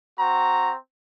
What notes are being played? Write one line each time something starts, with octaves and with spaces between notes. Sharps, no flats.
C4 F#4 A#5